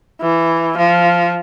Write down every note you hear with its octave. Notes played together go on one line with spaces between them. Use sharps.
E3
F3